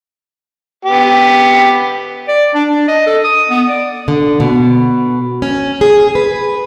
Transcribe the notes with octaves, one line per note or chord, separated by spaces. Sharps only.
B3 G4
D5
D4
D4
D#5
A4
D#6
B3
D5
D3
B2
C#4
G#4
B4